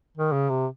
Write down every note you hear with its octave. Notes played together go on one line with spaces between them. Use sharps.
D#3
C#3
C3